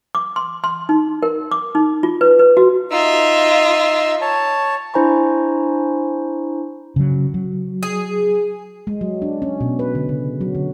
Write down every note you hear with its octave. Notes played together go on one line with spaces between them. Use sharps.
D6
C6
C6
D#4
A#4
D6
D#4
F4
B4
B4
F#4
D#4 F4 E5 E6
C#5 A5
D4 E4 C5 G#5 A#5 C#6
C#3 F#3
F#3
G#4
G#3
F#3
D4
C#4
B2
B4
D3
C#3
F#3
D3